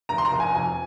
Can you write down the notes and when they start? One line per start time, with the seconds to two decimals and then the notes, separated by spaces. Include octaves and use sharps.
0.09 F1 A#5
0.18 C6
0.25 A#5
0.31 F1
0.40 G#5
0.55 F2 G#5